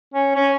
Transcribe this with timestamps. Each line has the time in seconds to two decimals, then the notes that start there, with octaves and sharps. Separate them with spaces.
0.14 C#4
0.35 C#4